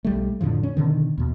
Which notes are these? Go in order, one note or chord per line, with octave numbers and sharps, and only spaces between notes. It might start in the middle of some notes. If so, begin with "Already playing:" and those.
B1 G3 A3
F2 A2 D3 F3
C#4
B2 D3 D#3
D#2 B2